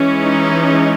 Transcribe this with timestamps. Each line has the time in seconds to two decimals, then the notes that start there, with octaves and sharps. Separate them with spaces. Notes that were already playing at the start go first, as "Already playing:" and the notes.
Already playing: E3 G#3 C#4
0.21 D#4